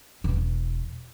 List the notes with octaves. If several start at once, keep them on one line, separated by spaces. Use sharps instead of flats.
E1 B2